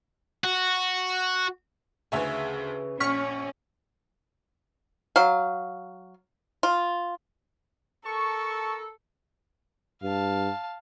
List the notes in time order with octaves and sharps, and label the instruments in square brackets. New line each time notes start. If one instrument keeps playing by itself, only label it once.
[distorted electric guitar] F#4
[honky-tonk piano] D2 E5 G#5 [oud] C#3 E3
[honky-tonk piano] A#1 [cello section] C#4 [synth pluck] C#6 F6 B6
[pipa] F#3 F5
F4
[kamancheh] A4 [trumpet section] A#4 A5 [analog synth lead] C#6
[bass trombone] G2 [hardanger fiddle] F5 A5